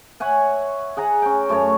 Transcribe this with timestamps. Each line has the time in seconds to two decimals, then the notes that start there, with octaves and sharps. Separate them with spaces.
0.20 C#5 E5 F#5 G#5
0.97 G#4 F#5 A#5
1.22 C#4 G5
1.49 F#2 A3 C#4 C#5